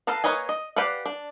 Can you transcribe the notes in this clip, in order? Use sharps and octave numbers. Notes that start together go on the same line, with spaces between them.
A4 B4 F5 A5 A#5
A#3 B4 C#5 D#5 G#5
D#5
G4 B4 D5 F5 F#5
D4